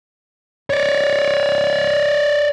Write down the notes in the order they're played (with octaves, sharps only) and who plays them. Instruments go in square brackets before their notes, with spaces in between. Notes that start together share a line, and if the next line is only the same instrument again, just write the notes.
[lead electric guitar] C#5 D5